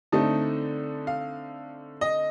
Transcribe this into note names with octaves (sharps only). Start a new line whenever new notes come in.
D3 A3 C4 D#4 A5
F5
D#5